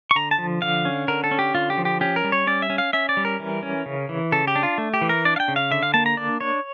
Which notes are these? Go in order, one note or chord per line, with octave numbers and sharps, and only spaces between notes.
C#6
D3 A#5
A5
F3
D3 F5
C#4
D3 A#4
A4
C#4
G4
D3 F4
G4
F3
G4
C#4 G4
A#4
G3
C#5
C#4 D5
E5
C#4
F5
C#4 E5
D5
G3
A#4
E3
C#4
C#3
E3
C#3 A4
G4
D4
F4
A3
G4
E3
A#4
D4 D5
F5
G5
C#3
F5
D3 E5
F5
A#3 A5
A#5
D4 D5
D4 C#5